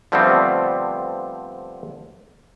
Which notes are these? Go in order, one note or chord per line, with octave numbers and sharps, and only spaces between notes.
D3 F3 G3 A3 B3 C4